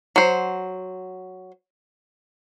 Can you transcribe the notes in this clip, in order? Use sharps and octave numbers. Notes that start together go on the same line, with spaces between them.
F#3 C5